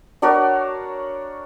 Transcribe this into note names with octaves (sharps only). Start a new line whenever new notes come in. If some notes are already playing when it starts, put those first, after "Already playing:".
D4 F#4 A#4 C#5